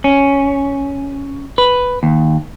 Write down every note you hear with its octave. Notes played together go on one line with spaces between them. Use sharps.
C#4
B4
D#2